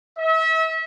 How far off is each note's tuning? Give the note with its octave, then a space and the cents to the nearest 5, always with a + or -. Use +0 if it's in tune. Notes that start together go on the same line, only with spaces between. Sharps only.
E5 -35